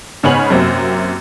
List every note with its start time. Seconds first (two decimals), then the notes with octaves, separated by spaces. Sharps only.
0.23 G#2 C#3 B3 C#5 G#5 F#7
0.50 F#2 C3 F#3 A#3 C4